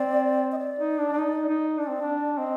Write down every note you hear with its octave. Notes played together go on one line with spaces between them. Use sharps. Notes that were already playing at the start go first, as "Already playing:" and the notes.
Already playing: C4 D5
D#5
D5
D#4
D4
D4
D#4
D#4
D4 D5
C4
D4
C4 D#5